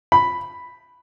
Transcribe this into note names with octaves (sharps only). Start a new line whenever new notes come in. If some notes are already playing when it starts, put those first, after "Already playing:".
B5